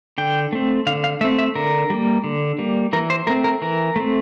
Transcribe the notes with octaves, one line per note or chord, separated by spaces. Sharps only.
D3 G5
A3 C4
D3 F5
F5
A3 C4 E5
E5
D3 A#4
G3 A#3
D3
G3 A#3
E3 A#4
C5
A3 C4 A#4
A#4
E3 A#4
A3 C4